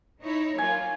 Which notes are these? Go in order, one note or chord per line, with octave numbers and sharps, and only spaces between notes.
D#4 E4 C#5
F#3 A#3 F4 G#5